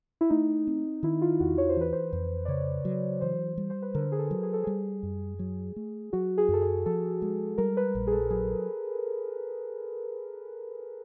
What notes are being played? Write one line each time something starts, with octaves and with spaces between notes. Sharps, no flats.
E4
A3 D#4
C4
D#3 E4
F4
E2 F#4
C#5
C5
E3 B4
C5
F2
D5
C#3 C#5
F#3
E3 C5
G3
C5
B4
D3 A#4
G#4
A4
F#3
G#4
A4
G3 G#4
F#2
F#3
A3
F#3 F#4
G#4
F#2 A4
G#4
F3 A4
G#3
G3 A#4
B4
A#1
G#4
A4
F#3 G#4